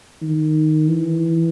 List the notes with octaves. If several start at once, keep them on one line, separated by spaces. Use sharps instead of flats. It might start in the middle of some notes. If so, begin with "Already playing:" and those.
D#3
E3